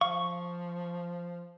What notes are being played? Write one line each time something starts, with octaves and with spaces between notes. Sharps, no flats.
F3 F5 C#6